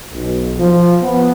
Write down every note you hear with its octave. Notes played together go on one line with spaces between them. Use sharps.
B1
F3
B3